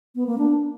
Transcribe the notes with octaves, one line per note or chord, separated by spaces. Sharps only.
B3
A#3
D4